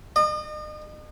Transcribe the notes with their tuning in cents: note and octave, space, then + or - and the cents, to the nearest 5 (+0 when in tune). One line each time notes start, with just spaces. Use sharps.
D#5 -40